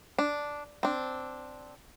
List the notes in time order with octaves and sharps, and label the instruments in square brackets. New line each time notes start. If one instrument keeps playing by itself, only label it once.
[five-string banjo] D4
C4 D4